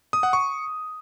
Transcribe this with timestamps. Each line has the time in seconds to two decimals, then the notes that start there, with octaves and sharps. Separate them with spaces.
0.13 D#6
0.23 F#5
0.33 C#6